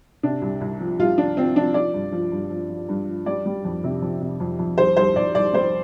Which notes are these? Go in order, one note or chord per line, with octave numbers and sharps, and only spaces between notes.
C3 D4
C2
C2
F3
C2 F4
F3 D4
F3 C4
F3 D4
F3 D5
G2
F3
G2
F3
F3
G2
F3
G3 D5
G3
F2
C3
F2
C3
F2
F2
C2 C5
C2 C5
C2 D5
C2 D5
G3 C5